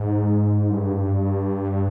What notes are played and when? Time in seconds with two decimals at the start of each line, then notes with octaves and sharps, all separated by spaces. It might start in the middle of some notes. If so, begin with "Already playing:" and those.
Already playing: G#2
0.70 G2